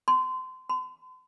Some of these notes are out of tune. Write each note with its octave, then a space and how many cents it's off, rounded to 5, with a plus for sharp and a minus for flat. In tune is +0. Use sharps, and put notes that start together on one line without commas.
C6 -25
C6 -45